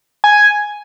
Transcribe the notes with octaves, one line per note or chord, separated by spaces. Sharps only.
G#5